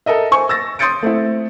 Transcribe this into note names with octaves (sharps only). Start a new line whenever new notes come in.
A4 A#4 D#5 E5
C5 G#5 C#6
E6 A6 A#6
C6 D#6 G6 A6 C#7 D7
A3 C4 E4